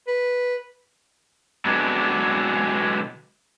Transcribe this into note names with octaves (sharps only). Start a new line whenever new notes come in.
B4
B2 D3 F#3 G#3 B3 D4